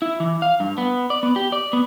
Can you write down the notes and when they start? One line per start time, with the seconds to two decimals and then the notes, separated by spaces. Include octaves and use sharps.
0.02 E4
0.20 E3
0.42 F5
0.60 G2
0.78 B3
1.10 D5
1.23 B3
1.36 G4
1.52 D5
1.73 B3